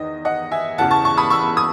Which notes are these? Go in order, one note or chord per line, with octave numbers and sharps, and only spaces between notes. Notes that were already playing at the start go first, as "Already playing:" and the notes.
Already playing: E2 D#3 D#5
D#5 F#5
E5 G#5
E2 C#3 E3 F#5 A5
A5 C#6
A5 C#6
B5 D#6
C#6 E6
D#6